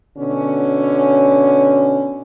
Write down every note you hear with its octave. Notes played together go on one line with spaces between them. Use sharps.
B2 D3 C#4